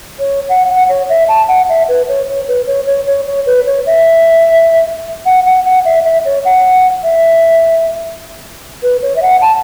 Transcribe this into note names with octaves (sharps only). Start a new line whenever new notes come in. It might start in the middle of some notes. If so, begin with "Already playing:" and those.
C#5
F#5
F#5
C#5
E5
A5
F#5
E5
B4
C#5
C#5
B4
C#5
C#5
C#5
C#5
B4
C#5
E5
F#5
F#5
F#5
E5
E5
C#5
F#5
E5
B4
C#5
E5
F#5
A5